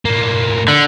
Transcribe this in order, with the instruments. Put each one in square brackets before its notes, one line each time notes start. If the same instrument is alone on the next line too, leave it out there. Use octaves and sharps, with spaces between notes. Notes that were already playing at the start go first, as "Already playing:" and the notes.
[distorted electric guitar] A2 A#3
[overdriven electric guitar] D3